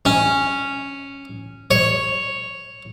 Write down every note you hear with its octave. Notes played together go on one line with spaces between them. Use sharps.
C#4
C#5